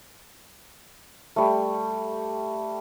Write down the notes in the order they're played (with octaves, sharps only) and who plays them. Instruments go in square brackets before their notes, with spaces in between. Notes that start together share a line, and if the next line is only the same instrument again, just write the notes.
[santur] G3 A3